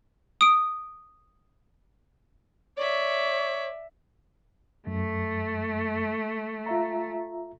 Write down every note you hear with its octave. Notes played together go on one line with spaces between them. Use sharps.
D#6 D7
C#5 D5 E5
F#2 A3
F4 E5 A#5